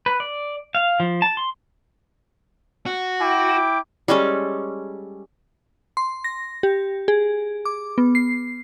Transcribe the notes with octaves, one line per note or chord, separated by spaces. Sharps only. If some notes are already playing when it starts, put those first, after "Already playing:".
B4
D5
F5
F3
A5
C6
F#4
E4 G5 D6
G3 G#3 C#4 A4
C6
A#6
G4
G#4
D6
B3
C7